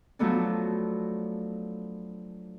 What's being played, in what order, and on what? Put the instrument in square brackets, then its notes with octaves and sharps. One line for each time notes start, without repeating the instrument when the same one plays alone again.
[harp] F3 F#3 A3 B3 D4